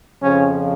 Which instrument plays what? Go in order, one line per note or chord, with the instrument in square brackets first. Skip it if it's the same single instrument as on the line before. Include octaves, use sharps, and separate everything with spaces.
[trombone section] F2 C#3 F3 C#4